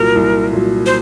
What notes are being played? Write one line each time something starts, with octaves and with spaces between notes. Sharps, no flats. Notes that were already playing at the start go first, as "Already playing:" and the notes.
Already playing: C2 A#2 F#3 A#4
C2
A#2 F#3
C5